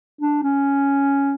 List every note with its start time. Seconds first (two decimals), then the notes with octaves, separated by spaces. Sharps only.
0.21 D4
0.43 C#4